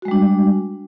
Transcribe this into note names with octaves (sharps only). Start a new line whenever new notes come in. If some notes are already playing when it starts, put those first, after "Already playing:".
G3 G#3 D4 F#4